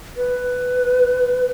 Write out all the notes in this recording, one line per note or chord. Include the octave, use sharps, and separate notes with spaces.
B4